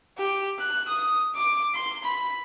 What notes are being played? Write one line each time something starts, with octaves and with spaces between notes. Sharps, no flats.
G4
F#6
D#6
D6
C6
B5